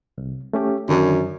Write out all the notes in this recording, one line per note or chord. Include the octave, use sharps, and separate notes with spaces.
C2
A3 C#4 G4
F#2 D3 D#3 D4